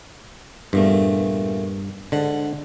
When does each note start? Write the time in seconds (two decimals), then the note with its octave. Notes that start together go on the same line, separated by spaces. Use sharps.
0.73 E2 G2 A#2 A3
2.12 G#2 D3 F#5